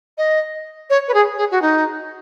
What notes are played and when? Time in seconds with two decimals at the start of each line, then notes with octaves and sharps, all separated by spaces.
0.18 D#5
0.90 C#5
1.08 B4
1.14 G#4
1.37 G#4
1.51 F#4
1.62 D#4